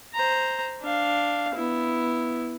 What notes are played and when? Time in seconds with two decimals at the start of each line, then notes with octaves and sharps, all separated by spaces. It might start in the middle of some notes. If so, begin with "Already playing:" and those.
0.14 C5 A#5
0.82 D4 F5
1.55 B3 E4